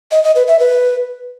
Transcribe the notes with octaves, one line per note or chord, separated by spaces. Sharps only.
D#5
D#5
B4
E5
B4